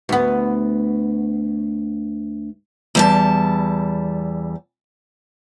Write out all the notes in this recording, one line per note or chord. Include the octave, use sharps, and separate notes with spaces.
D2 B3
E2 G3 A5